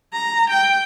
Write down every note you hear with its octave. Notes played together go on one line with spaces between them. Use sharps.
A#5
G5